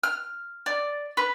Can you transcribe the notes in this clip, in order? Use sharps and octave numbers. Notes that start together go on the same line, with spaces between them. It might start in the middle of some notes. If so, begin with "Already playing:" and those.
F6
D5
B4